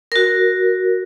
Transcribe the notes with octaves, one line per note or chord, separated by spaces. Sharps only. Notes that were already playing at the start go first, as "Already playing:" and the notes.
F#4 A#4